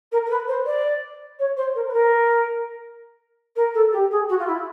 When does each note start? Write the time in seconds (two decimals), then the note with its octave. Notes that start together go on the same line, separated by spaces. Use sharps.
0.12 A#4
0.25 A#4
0.30 B4
0.48 C5
0.66 D5
1.39 C#5
1.57 C5
1.75 A#4
1.88 B4
1.93 A#4
3.56 A#4
3.74 A4
3.92 G4
4.11 G#4
4.29 F#4
4.39 F4
4.47 E4